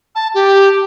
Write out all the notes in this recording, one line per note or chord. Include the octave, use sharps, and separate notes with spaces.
A5
G4